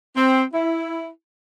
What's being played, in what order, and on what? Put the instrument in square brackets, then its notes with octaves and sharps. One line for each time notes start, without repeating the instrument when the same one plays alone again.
[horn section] C4
E4